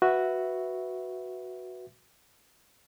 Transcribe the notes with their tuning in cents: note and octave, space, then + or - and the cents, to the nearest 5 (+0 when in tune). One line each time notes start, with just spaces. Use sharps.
F#4 +0 B4 +0 E5 +0